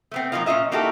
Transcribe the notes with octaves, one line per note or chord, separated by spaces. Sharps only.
A3 B3 C4
F3 F#3 A#3 D#4 F4
A#2 C#4 F4 D#5 E5
A#3 D#4 E4 F#4 G4 A4